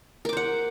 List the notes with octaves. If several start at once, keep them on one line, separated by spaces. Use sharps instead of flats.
A#4 C5 F#5 D6